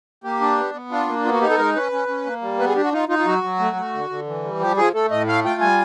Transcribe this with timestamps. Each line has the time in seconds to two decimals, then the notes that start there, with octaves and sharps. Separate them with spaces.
0.24 A#3 G4
0.41 D4
0.57 B3
0.74 B3
0.91 D4 F4
1.08 A#3
1.24 B3 F4
1.33 F#4
1.41 D#4 G4
1.50 A4
1.58 G#3 A#4
1.76 C#4 B4
1.92 C#4
2.08 C#4
2.25 A#3
2.42 G3
2.59 B3 B4
2.68 G#4
2.76 D4 G4
2.84 F#4
2.93 D#4 F4
3.09 D#4 F4
3.19 F4
3.26 F#3 F#4
3.44 F#3
3.59 A3
3.76 A3
3.93 D3
4.10 D3
4.27 E3
4.44 G3
4.60 F3 G4
4.77 F3 G#4
4.94 A3 A4
5.11 A2 D#5
5.27 A3 F5
5.45 F4 G5
5.61 G3 G#5